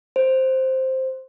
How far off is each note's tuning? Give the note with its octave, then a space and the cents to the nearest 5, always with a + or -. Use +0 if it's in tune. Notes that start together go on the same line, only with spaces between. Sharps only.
C5 +5